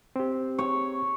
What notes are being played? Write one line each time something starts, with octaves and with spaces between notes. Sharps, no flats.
C4 G4
C#5